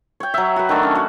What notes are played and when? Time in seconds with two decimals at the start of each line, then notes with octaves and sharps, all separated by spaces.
0.20 C#5 G5
0.34 F#3 E5
0.56 F#4 B4
0.69 D#3 A3 D4
0.83 C#4
0.95 F#4